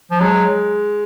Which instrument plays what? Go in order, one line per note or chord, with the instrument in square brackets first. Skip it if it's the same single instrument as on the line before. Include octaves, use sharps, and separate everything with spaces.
[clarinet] F3
[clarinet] F#3 [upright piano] G#3